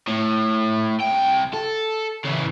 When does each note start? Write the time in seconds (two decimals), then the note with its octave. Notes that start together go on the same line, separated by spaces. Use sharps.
0.08 A2
1.01 C2 G5
1.54 A4
2.25 C#3 E3